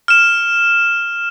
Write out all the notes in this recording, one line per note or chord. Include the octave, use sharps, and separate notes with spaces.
F6 E7